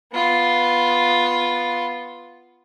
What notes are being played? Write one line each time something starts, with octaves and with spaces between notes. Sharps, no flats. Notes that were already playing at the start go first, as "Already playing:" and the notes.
B3 F4